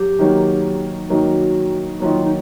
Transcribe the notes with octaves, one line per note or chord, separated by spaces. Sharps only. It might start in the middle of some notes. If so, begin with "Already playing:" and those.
Already playing: F#3 G4
D#3 F#3 A#3
D#3 F#3 A#3 F#4
D#3 F#3 A#3 F4
D#4